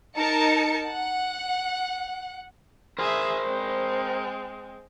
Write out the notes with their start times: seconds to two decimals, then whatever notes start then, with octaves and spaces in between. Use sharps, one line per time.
0.17 D#4 A#4 A5 C#7
0.92 F#5
2.99 G#4 A#4 C5 E5
3.43 G#3 C4